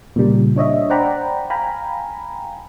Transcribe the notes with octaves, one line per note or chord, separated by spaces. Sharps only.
A#2 C#3 G3
D4 C#5 D#5 E5
C5 D5 F#5 G5 A#5 B5
F5 G5 G#5 A#5 B5